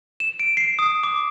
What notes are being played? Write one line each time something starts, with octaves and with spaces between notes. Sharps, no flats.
E7
D7
C7
D#6
D6